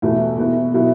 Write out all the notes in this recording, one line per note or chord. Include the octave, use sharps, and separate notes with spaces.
E2 B2 A3 E4
B2 B3 E4
B2 F#3 B3 E4